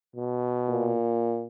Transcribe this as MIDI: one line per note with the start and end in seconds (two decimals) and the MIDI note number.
0.16 0.96 47
0.69 1.47 46